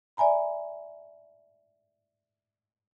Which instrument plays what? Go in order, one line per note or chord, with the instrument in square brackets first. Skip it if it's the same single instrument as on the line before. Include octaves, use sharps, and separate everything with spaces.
[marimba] D5 E5 G#5 A#5 B5